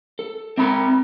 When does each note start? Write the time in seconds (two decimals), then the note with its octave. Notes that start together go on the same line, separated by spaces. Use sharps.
0.19 A4
0.58 C4 E5 A#5 B5